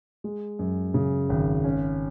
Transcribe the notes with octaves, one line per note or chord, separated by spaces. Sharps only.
G#3
F#2
C#3
G#1
C#4